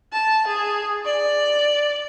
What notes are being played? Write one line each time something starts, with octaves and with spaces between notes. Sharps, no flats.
A5
G#4
D5